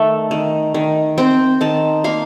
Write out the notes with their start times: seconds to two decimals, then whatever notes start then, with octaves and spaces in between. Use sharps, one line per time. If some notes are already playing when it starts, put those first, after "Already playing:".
Already playing: D#3 A3
0.31 D#3
0.74 D#3
1.18 C4 G5
1.61 D#3 A5
2.04 A#3 F5